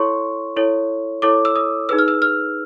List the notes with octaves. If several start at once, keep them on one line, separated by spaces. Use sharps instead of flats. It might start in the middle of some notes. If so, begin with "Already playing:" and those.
Already playing: E4 A4 C#5 C6 C#6
E4 A4 C#5
E4 A4 C#5 D6
E6
D#6
D#4 G#4 B4 E6
F6
E6
F6